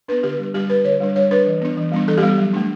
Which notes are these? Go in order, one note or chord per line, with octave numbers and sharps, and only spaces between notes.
B3 D4 B4
D3 G4
G3 D4
G3 G4
D4 B4
D3 C#5
G3 D4
G3 C#5
D4 B4
E3
B3 D4
E3
G3 B3 D4
E3 A4
G4
G3 B3
F#3
A3 D4